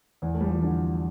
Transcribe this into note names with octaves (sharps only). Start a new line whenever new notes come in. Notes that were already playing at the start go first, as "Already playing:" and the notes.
E2 E3
A3
G3
F3
E3
D3